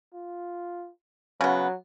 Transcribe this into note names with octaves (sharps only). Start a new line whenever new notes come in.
F4
C#3 F#3 B3